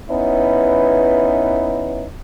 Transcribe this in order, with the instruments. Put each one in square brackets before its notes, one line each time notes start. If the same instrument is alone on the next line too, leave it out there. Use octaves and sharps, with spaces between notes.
[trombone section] B3 C#4 D#4 E4 B4